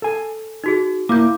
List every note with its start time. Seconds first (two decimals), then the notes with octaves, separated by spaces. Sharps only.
0.02 A4 G#5
0.64 D#4 F#4 G#4
1.09 A#3 E4 D6 G6